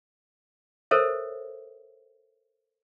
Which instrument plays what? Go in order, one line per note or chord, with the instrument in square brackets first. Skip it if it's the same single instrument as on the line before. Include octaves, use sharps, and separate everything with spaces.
[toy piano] A4 A#4 C5 C#5 E5